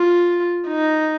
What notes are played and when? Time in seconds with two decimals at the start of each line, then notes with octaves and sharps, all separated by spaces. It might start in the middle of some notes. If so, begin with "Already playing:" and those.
Already playing: F4
0.68 D#4